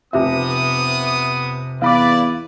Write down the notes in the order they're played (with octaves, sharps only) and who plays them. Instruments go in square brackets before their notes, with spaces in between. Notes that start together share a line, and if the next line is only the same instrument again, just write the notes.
[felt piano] F1 C3 E5 [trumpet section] B3 D#6
[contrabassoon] E2 [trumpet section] E4 B4 D5 [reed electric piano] F5 B5 D6